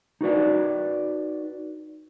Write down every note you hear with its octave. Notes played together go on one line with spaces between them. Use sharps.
D#4 F#4 B4 D5